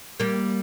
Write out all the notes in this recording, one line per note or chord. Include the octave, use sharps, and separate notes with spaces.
G3 A#3